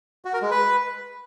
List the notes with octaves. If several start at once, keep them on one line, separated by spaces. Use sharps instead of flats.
F#4
A#4
G#3
B4